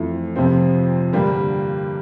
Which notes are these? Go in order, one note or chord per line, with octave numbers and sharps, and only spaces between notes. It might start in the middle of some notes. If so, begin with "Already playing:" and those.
Already playing: F2 E3 A3 E4
F2 C3 F3 C4
G2 D3 G3 A#3